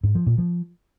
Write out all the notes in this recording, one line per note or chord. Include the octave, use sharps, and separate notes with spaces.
G#2
F3
A#2
F3